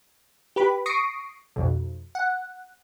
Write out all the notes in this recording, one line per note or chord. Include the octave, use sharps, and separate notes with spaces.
G4 B4 B5
C#6 D#6 A#6 C7 D7
B1 F2
F#5